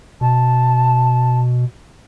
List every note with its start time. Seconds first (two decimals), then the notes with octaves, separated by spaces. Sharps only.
0.21 B2 A5